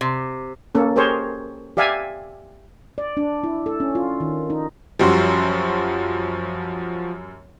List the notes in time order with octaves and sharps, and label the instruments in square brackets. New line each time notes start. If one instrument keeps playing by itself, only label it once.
[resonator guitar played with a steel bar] C3
[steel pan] A#3 C#4 A4
G4 G#4 A#4 C5 C#5
G4 D5 E5 F5 G#5
[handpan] D5
D4
E4
A4
C#4
F4
D#3
D#4
[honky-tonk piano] F#2 G3 [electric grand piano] F3 F#4 C6